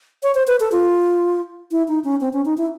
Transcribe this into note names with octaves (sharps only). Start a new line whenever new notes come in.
C#5
C5
B4
A4
F4
E4
D#4
C#4
C4
C#4
D#4
E4